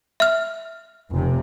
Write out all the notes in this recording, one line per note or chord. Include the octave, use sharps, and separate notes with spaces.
E5 F6
F1 C3